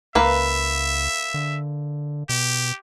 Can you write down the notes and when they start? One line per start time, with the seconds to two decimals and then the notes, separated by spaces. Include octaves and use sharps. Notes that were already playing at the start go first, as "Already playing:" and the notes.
0.15 C#2 A#3 B4 E5
1.34 D3
2.29 B2 G4